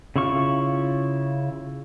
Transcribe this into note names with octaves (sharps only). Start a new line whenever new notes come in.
C#3 E4 F4 C#6 F6